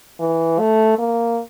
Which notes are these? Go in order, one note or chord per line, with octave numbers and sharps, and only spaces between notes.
E3
A3
A#3